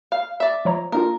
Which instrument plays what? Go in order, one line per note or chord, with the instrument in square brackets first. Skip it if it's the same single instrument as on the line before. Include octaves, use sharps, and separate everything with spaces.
[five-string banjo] F5
D5 E5
[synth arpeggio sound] F3 C#5 A#5
[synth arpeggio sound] A#3 D4 F4 [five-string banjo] A#4